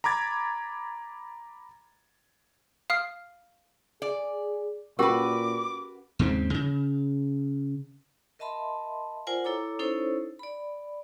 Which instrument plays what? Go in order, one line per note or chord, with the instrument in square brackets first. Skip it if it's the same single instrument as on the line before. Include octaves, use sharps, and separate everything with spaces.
[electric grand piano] A#5 B5 D6 G#6 A6
[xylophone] F5 D#6 F6 C7
[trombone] G#4 [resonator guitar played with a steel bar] D5
[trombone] A#2 [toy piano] C#4 G4 A#4 [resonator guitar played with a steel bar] F#4 B4 [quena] D6
[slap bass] D#2 G#2 C#3 C4
C#3
[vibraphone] A#4 D#5 E5 A5 B5 C6
F4 A#4 C5 D5 F#5 G#5
E4 A4 C#5 A#5 D6
C#4 D#4 E4 A4 C5 C#5
D5 B5